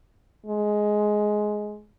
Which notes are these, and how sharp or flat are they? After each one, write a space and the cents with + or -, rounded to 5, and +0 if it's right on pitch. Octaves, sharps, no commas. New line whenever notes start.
G#3 +10